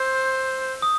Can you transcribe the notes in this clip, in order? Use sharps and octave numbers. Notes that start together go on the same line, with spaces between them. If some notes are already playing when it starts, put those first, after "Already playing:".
Already playing: C5 E6 G6
D#6